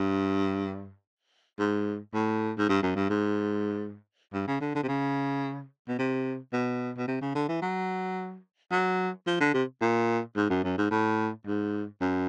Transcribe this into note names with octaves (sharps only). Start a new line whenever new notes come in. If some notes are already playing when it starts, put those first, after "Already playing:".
Already playing: G2
G#2
A2
G#2
G2
F#2
G2
G#2
G2
C#3
D3
D3
C3
C#3
B2
C3
B2
B2
C3
C#3
D3
E3
F#3
F#3
F3
D3
C3
A#2
G#2
F#2
F#2
G#2
A2
G#2
F#2